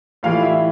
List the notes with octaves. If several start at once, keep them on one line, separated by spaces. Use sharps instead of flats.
A2 E3 G3 F4 F5
E4 E5